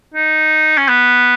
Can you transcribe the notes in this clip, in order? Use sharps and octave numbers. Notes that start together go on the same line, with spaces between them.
D#4
C#4
B3